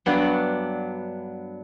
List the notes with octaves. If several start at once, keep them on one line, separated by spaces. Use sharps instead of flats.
G2 F#3 B3 D4